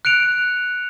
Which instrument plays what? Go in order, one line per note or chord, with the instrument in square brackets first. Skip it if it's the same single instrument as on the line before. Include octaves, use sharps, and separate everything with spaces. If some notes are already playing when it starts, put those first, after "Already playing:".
[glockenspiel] F#6 C#7 D7 F7